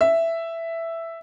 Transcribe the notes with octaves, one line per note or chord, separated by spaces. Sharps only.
E5